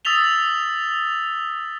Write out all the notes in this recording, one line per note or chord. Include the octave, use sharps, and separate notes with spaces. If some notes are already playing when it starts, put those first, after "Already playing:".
D#6 E6 A6 B6 F7 G7